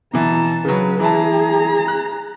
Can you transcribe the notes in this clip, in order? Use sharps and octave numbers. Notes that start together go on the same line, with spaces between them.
B2 E3 A5 A#5
C#3 F#3 B4
E3 E4 G#4 A5 A#5
F#6